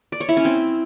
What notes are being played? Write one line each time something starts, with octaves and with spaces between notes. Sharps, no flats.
D5
C#5
E4
C#4
C4